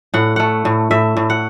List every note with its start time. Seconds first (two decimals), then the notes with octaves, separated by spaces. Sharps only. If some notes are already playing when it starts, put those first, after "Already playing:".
0.14 A2 F#5
0.36 A3 F#5
0.65 A2
0.91 A2 E5
1.17 A2
1.30 F#5